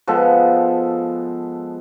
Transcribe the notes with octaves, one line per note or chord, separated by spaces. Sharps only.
F3 G#3 B3 A4